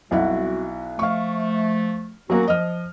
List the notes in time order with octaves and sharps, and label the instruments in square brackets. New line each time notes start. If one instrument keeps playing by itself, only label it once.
[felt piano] B1 E4 F#5 [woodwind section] G3 C4 F#4
[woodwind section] F3 A3 [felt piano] F5 C#6
[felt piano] F#3 A#3 [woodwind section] B3 C#4 F#4
[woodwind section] F3 [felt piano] D#5 F6